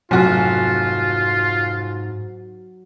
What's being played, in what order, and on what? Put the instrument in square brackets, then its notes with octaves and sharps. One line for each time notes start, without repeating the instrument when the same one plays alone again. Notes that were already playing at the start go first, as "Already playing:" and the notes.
[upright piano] F1 F#4 [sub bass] G#2 [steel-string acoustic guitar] F#3 [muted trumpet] F4